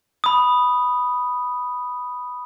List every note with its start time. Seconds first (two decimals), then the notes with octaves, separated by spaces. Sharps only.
0.24 B5 D#6